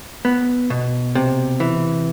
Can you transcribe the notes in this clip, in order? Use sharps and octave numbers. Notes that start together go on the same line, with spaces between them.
B3
B2
C3
E3